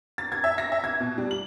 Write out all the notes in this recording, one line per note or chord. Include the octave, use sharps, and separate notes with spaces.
A6
G#6
E5
A#6
E5
G#6
B2
G3
F#7